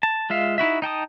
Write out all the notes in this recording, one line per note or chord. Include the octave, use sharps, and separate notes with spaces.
A5
G#3 F4 E5 F5
D#4 E4 F#4 E5
D#4 G5 A5 D#6